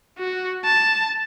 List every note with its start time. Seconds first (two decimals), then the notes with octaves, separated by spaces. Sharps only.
0.19 F#4
0.65 A5